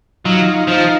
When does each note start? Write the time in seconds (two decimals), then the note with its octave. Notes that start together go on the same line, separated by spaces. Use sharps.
0.25 F#3 D#4 F4
0.68 F3 D#4 F4